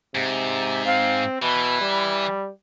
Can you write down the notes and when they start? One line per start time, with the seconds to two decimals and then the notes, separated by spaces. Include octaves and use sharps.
0.15 G#2 C3
0.86 C4 F5
1.42 B2 E3 B5
1.81 G3